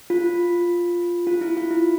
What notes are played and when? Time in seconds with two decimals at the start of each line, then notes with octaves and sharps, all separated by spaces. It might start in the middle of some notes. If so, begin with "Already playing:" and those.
0.10 F4
1.27 F4
1.41 E4
1.57 F4
1.71 E4